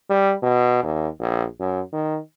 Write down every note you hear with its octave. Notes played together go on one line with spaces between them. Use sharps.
G3
B2
D#2
A#1
F#2
D#3